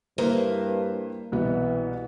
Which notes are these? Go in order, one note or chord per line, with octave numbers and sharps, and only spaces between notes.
G2 A#3 E4 B4 C5
C2 B2 E3 B3